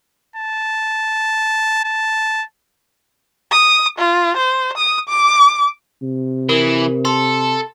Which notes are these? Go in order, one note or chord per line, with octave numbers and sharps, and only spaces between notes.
A5
A5
D#6
F4
C5
D#6
D6
C3
E3 A#4
A4 C6